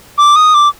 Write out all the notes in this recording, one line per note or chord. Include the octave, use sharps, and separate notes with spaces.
D6
D#6
D6